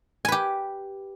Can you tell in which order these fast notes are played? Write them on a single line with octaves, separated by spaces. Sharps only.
G#5 B4 G4